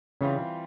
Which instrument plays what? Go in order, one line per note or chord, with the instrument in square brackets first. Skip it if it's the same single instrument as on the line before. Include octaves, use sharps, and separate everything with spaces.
[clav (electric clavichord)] C#3 [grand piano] E3 G3 C4 F4